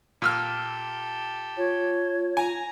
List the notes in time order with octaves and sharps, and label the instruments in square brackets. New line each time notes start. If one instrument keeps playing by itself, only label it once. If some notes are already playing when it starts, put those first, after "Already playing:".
[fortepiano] A#2 E6 F6 [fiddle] G4 A4
[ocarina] F4 [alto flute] C#5
[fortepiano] G#5 [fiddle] A#5